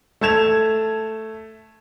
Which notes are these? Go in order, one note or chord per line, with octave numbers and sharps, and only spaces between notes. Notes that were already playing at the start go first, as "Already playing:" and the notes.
A3 A5 G#6 E7 F7